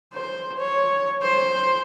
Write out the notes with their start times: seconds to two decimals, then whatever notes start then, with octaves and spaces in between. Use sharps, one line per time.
0.14 C5
0.58 C#5
1.22 C5